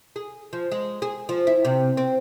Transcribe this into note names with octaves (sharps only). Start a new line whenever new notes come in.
G#4
F3
G#3
G#4
F3
E4
C3
C4